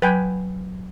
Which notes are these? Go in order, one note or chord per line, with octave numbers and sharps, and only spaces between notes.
F#3 B4 G5 G#5